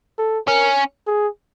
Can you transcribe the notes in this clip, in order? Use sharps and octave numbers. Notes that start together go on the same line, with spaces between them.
A4
C#4 A#4
G#4